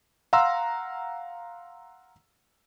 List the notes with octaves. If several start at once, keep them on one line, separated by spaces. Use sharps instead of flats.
F5 F#5 A#5 C6 E6